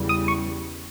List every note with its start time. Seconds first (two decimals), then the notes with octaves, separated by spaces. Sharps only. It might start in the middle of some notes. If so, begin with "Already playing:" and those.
Already playing: E2 C#3 E3 G3
0.09 D#6
0.28 C#6